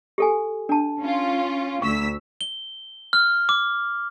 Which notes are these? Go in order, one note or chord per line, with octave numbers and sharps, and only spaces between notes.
G4 A4 G#5
D4 A5
C#4 F4
D2 C#6 E6 B6
G7
F6
D6